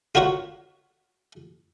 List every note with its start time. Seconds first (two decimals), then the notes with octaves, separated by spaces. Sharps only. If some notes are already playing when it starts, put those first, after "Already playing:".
0.15 F4 F#4 A#4 C#5 F#5